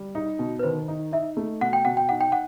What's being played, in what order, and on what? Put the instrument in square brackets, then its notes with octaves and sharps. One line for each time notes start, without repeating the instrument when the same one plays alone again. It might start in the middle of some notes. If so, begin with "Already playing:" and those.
Already playing: [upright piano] G3
D#4
B2
[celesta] B4
[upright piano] D#3 [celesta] C5
[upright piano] D#4
[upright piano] D#4 [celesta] E5
[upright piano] A3
[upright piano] B2 [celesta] F#5
[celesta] G5
[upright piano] B2 [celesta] F#5
[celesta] G5
[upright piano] D#4 [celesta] F#5
[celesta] G5
F#5